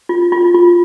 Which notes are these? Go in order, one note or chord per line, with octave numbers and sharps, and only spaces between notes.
F4
F4
F4